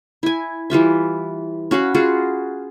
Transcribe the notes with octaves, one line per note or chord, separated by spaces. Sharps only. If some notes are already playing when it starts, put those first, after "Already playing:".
E4 G#5
E3 G3 F4 E5
C#4 F#4 F5 B5
F4 F#4 G#4